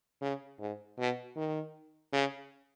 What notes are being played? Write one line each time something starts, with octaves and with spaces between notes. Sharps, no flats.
C#3
G#2
B2
D#3
C#3